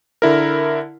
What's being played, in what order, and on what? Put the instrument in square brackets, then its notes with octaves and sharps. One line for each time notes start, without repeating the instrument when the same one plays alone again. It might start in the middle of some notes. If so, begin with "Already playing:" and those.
[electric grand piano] D3 E4 A#4